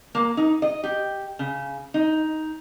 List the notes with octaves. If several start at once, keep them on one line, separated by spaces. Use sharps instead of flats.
A#3
D#4
D#5
G4
C#3
D#4